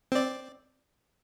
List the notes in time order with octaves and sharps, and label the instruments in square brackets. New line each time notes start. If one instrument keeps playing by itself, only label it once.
[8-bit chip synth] C4 D5